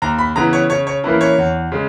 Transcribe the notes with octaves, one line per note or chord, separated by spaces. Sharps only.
D#2 A#5
B5
C#3 E3 B3 A#5
C#5
C#3 C#5
C#5
E3 A#3 C#4 E4 B4
C#5
E2
C#3 G#3